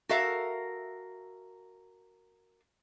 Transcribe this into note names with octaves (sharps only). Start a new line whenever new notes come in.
F#4 A4 A#4 E5 F5